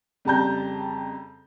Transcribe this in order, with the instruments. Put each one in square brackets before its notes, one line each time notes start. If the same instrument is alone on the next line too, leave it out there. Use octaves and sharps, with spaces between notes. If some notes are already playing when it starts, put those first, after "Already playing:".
[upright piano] F2 C#3 G3 A5 A#5 G6